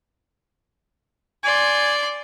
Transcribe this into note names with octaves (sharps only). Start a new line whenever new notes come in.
D5 G#5 C6